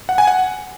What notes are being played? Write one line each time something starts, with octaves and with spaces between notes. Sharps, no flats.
F#5
G#5
F#5